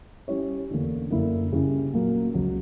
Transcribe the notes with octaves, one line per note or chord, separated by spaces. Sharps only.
G3 C#4 E4 G4 C#5
E2 D3 A#3
F#2 D3 A#3 E4
C#3 G3 C#4 E4
A#2 F#3 A#3
C#2 C#3 F#3